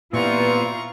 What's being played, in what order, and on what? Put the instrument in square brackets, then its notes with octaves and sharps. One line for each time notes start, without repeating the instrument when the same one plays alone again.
[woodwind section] G2 E3 C4 [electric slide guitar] A#2 B3 [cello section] F4 [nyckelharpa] A#5 C#6